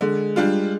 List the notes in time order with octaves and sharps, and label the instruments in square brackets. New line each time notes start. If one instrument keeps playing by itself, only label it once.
[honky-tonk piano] D3 [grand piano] G#3
[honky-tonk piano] G3 D4 F4